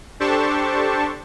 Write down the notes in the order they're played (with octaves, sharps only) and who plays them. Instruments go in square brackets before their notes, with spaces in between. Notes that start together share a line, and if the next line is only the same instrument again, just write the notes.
[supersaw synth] D4 G4 A4 C5 A5 C#6